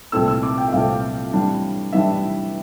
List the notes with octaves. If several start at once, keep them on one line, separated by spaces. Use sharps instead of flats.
C2 A#2 A3 C4 E6
E6
D6
G5
E5
C2 A#2 A3 C4 F5
A2 E3 G3 D4
A2 E3 G3 D4 E5